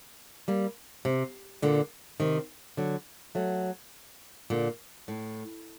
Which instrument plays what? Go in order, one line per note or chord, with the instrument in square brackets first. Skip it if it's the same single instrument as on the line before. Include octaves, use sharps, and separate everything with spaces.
[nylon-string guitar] G3 A#3
C3
A#2 D3
C3 D#3
D3 F#3
F#3 A3
A#2 D3
A2